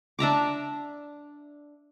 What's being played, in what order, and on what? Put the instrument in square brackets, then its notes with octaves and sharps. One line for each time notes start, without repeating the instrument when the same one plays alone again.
[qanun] D4 E5 A#5 D6